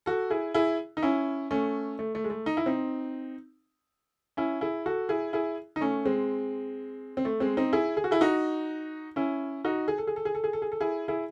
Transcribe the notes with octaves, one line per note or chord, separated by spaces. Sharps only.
F#4 A4
E4 G#4
E4 G#4
D#4
C#4 E4
A3 C#4
A3
A3
G#3
A3
D#4
E4
C4 D#4
C#4 E4
E4 G#4
F#4 A4
E4 G#4
E4 G#4
D#4
A3 C#4
G#3 C4
C4
A3
G#3 C4
C4 D#4
E4 G#4
G#4
F#4
E4 G#4
D#4 F#4
C#4 E4
D#4 F#4
G#4
A4
G#4
A4
G#4
A4
G#4
A4
G#4
A4
E4 G#4
E4 G#4